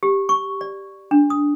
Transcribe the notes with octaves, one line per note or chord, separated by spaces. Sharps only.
G4
C#6
D5
D4
D#6